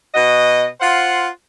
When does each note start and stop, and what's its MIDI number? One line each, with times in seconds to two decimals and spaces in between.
0.15 0.67 47
0.15 0.67 66
0.15 0.67 75
0.80 1.28 65
0.80 1.28 72
0.80 1.28 77
0.80 1.28 78